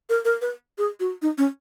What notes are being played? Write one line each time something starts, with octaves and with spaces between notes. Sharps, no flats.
A#4
A#4
B4
G#4
F#4
D#4
C#4